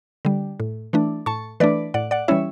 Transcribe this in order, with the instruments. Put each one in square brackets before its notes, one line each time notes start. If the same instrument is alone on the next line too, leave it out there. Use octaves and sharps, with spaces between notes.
[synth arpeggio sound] D3 G3
A2
E3 A3 D4
A2 A5 C#6
E3 A3 D4 B4 D5
A2 D5 F#5
D5 F#5
E3 G3 C#4 E4 C#5 E5